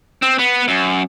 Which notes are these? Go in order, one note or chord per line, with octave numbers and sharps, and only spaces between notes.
C4
B3
F#2